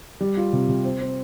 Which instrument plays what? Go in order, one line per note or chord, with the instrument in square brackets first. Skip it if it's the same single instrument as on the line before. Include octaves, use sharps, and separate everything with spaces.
[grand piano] G3
F4
C3
C3
C4
C4